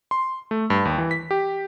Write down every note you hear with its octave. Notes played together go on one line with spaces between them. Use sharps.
C6
A3
G2
D#2
E3
B6
G4